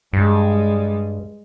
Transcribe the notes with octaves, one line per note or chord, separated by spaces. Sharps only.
G2 G3 G#3